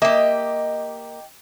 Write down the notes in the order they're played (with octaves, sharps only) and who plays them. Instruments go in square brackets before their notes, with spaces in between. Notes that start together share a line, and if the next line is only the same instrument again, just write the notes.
[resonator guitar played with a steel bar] A#3 E5 [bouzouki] G4 D#5